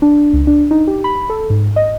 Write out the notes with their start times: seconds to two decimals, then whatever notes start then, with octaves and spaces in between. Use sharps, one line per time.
0.02 D4
0.33 C#2
0.47 D4
0.71 D#4
0.87 G4
1.04 B5
1.30 A4
1.50 G#2
1.76 D#5